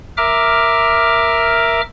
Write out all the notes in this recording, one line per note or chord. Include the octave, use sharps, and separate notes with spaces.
A#4 E5 D6 F6